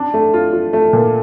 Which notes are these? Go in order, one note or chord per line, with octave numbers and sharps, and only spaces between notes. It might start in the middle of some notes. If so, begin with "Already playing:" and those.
Already playing: D4
A3
F4
F4
A3
A#2